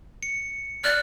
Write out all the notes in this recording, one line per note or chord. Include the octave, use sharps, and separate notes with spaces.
C#7
D5 F6 F#6